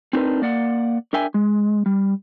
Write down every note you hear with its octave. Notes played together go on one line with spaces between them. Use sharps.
C4 D4 D#4 F#4 A#4 B4
A#3 D5 F#5
D4 A#4 E5 G5 G#5
G#3
G3